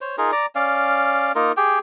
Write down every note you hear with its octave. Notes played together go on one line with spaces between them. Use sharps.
C5 C#5
D#4 F4 G#4 A#4
D5 A#5
C#4 D5 F5
A#3 D#4 F4 A#4
G4 G#4 G5